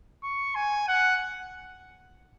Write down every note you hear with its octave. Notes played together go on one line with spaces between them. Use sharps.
C#6
G#5
F#5